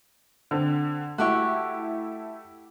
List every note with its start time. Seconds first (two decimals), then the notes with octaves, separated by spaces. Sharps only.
0.51 D3 C4
1.18 A3 E4 F#4 G4 C#6